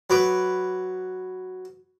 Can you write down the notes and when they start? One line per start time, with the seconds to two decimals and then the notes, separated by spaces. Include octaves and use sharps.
0.10 F#3 B4 D6